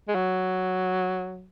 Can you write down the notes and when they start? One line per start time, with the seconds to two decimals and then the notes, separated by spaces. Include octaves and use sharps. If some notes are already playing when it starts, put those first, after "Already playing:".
0.08 G#3
0.15 F#3